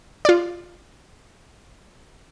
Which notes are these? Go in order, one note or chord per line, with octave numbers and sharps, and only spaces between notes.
F4 D5